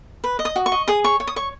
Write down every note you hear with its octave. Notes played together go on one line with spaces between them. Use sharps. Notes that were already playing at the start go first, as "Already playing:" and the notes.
B4
D#5
D#6
F#4
C#6
D#5
G#4 D#6
C#5 C#6
C#5
D#6
C#5 C#6